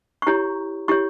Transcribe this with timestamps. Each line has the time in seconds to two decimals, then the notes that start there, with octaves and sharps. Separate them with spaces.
0.22 C#6
0.27 E4 G4 C#5 A#5
0.88 E4 G4 C#5 C#6